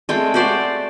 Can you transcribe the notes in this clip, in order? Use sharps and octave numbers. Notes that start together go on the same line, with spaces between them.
G#3 A3 C4 G5
F#4 G4 C5 D5